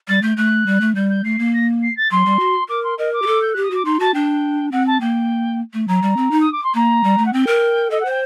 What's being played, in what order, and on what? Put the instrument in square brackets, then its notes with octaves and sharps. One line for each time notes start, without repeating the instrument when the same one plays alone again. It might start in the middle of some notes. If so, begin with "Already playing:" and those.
[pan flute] G3 [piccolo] A6
[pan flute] A3 [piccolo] G6
[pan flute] A3 [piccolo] F#6
[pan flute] G3
A3
[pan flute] G3 [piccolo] G6
[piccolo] G6
[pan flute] A3 [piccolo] C7
[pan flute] A#3
[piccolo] A#6
C7
A6
[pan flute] F#3 [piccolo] C6
[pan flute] G3
F#4
[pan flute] A#4 [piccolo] D6
[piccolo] C6
[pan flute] A#4 [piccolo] D#5
[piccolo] D6
[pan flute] G4
A4
[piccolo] G6
[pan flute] G4 [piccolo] F#6
[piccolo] D#6
[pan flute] F#4 [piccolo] D6
[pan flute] D#4 [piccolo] C6
[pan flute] F#4 [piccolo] A5
[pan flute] D4 [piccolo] G5
[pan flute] C4 [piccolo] F#5
[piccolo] A5
[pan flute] A#3 [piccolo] G5
[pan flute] A3
[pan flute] F#3 [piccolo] A#5
[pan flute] G3
C4
D#4
[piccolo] D#6
D6
C6
[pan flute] A#3 [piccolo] A#5
[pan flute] G3
A3
[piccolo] F#5
[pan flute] C4 [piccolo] G5
[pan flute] A#4
[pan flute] A4 [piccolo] D#5
[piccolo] F#5
[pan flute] C5 [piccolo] G5